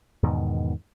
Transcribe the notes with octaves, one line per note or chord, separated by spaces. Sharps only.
E2 G#2 B2 D#3